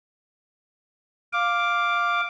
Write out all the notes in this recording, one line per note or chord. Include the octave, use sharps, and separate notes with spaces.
F5 D6